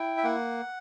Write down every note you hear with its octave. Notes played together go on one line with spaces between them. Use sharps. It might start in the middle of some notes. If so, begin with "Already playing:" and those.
Already playing: E4 G5
E5
A#3 F#5